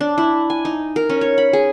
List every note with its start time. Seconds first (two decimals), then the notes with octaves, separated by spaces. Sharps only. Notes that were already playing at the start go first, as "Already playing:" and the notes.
0.01 D4
0.18 E4
0.50 G#5
0.65 D#4
0.96 A#4
1.10 C#4
1.21 C#5
1.38 B5
1.53 G#4